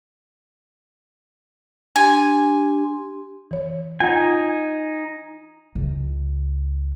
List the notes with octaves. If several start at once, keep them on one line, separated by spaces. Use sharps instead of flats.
D4 G4 G#5 C6
E3 C#5
D#4 F4 F#5 G#5 G6
C#2